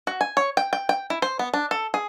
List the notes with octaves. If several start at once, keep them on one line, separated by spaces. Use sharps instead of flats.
F#4
G#5
C#5
G5
G5
G5
E4
C5
B3
D4
A4
G#4